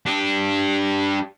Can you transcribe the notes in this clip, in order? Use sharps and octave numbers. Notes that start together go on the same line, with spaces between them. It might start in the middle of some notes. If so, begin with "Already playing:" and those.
D4 G4